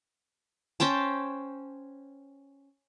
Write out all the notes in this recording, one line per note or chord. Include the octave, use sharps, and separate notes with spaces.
C#4 C5 G5 A5